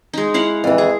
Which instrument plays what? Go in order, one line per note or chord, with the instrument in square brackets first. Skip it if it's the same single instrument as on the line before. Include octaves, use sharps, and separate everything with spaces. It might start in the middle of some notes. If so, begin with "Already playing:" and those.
[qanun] G#3 D#4
E4 F5 F#5
[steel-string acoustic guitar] F2 E3
[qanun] G#4